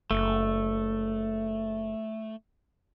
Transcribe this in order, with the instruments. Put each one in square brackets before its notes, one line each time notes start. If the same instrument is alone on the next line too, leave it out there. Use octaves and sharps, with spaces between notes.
[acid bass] F#1 [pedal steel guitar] A3